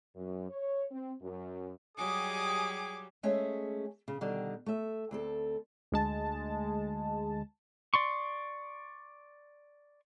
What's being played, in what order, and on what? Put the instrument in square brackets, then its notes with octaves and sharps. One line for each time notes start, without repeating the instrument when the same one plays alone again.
[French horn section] F#2
C#5
C4
F#2
[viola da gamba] F#3 G3 G4 [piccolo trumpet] G#4 [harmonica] D#5 D#6 [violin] G#5 D6
[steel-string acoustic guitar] G#3 A3 C#4 G#4 C#5 E5
C#3
B2 D3 D#3 G3
A3 E5
D2 C4 A4
[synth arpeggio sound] D2 G#3 A5
[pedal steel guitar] D5 C6 C#6